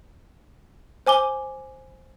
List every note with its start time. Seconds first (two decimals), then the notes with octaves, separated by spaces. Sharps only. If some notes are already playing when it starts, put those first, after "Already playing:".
1.06 C5 G#5 D6 G7